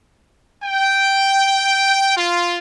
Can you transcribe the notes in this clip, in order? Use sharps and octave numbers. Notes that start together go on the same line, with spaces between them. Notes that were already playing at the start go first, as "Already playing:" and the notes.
G5
F4